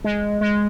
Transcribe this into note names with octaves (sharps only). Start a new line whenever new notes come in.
G#3
G#3